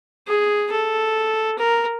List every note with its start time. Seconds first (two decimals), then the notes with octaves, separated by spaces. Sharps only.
0.27 G#4
0.71 A4
1.58 A#4